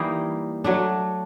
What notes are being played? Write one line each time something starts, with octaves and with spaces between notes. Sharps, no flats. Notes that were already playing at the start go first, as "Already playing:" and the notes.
Already playing: E3 G3 A#3 D#4
F#3 A3 D4